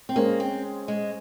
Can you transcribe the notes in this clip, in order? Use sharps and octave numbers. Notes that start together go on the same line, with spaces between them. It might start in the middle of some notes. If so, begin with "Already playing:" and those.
C4
G#3 A#3 C#4 G#4 C5
C4
G#3